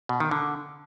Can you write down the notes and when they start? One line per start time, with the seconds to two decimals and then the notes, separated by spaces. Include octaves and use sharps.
0.09 B2
0.20 D#3
0.31 D3